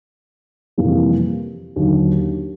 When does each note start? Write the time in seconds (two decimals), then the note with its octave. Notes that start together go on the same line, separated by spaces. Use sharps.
0.78 F2 C3 E3 G3 A#3
1.76 D#2 D3 F#3